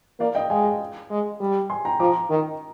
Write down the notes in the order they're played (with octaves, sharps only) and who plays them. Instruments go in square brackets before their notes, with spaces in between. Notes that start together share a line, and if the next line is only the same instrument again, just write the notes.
[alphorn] A#3 [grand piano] D5 F5
[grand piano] D#5 G5
[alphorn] G#3 [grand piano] F5 G#5
[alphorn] G#3
G3
[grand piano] G#5 C6
G5 A#5
[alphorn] F3 [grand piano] A#5 D6
[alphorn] D#3